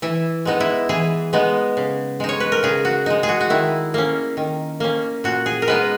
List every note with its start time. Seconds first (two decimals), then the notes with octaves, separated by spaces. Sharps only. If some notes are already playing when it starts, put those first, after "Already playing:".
0.02 E3 E4
0.45 G#3 B3 D#4
0.60 E4
0.89 E3 G#4
1.33 G#3 B3 D#4
1.77 C#3
2.20 G#3 D#4
2.29 C#5
2.40 B4
2.52 A#4
2.63 C#3 G#4
2.85 F#4
3.06 G#3 D#4
3.23 G#4
3.29 F#4
3.41 F#4
3.50 D#3 E4
3.94 A#3 C#4
4.37 D#3
4.80 A#3 C#4
5.24 A#2 F#4
5.46 G#4
5.62 A#4
5.67 G#3 B3 D#4 B4